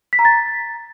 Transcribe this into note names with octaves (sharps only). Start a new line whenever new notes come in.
B6
A#5
A6